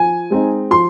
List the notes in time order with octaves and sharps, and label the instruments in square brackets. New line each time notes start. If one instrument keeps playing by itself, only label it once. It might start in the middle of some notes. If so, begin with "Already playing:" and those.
Already playing: [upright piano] F3 G#5
G#3 C4 D#4
F3 C6